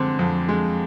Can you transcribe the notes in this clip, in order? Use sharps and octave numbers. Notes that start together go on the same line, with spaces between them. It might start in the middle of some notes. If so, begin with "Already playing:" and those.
Already playing: F2 D3 G#3 C4
F2
G#3